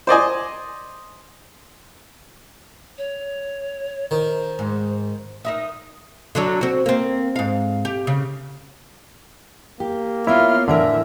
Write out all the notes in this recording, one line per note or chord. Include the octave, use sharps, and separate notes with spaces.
C5 D5 D#5 G#5
C#5
D#3 C5
G#2
D#4 A#4 E5 D#6
D3 F#3 D4
C4 F#4
A#3 C4
G#2 F5
G4
C#3
A#3 G4
B3 E4 F4 A#4 C#5 F6
A2 D3 E3 A#4 E5